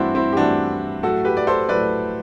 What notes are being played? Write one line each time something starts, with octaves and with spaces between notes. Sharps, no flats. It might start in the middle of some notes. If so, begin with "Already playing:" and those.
Already playing: G2 E3 A3 C4 D4 E4 F#4
C4 E4
G4
G2 E3 A3 D4 F#4
A2 F#3 A3 F#4 A4
G4 B4
D5
A4 C5
A2 F#3 A3 B4 D5